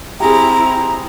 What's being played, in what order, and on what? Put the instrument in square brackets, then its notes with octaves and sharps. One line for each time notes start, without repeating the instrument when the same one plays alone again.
[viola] C4 E4 [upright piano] G4 G#4 [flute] A#5